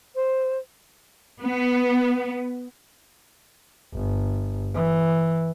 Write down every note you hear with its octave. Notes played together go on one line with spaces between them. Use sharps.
C5
B3
G1
E3